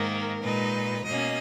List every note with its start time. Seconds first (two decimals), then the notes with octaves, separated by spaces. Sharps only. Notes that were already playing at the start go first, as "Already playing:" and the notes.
Already playing: G#2 D#3 A#3 A#4
0.43 A#2 G#3 D#4 B4
1.05 B2 A#3 C#4 D#5